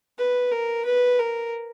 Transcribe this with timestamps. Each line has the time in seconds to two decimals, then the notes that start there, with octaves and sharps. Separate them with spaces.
0.18 B4
0.52 A#4
0.85 B4
1.19 A#4